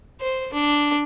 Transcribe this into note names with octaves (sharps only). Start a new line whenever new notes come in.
C5
D4